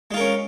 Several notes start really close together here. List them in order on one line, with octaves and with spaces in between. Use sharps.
G#3 F4 A#4 C#4